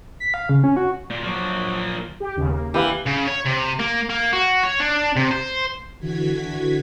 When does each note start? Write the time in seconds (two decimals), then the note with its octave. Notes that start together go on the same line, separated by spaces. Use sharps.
0.20 B6
0.34 F5
0.49 C#3
0.64 C#4
0.77 F#4
1.10 A#2
1.23 F3 F#3 A#3
2.20 G4
2.36 D#2 C#3
2.48 A#3
2.74 E3 G4 B4 F5
3.07 C#3
3.28 C#5
3.45 C3
3.79 A#3
4.09 A#3
4.33 F#4
4.63 C#5
4.80 D4
5.16 C3
5.31 C5
5.99 D3 E3 F#4 G#6 B6